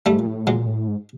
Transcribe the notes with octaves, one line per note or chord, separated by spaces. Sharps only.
G#2 G3 A3
A#2
A2
A#2 F#3 G#3
A2
G#2